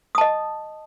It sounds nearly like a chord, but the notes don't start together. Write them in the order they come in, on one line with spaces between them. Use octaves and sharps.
D#6 A5 D#5